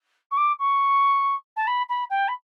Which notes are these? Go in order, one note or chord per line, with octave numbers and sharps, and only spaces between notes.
C#6
D6
C#6
A5
B5
B5
G5
B5